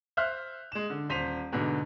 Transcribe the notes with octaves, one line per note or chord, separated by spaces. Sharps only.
C5 E5 F6 F#6
G#3 E7
D3
D#1 C5 B6 D#7 F7
G#2 B2 D3